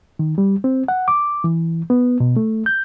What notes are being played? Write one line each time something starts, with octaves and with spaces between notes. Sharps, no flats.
D#3
G3
C4
F#5
D6
E3
B3
B2
A3
G6